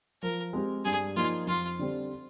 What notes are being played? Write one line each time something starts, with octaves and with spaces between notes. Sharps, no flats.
F3 A#4
G#3 C4 G4
G2 G#4
F3 A#3 D#4 F4
F2 F4
D3 G3 C4